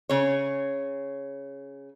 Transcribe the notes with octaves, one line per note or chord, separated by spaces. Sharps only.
C#3 C#5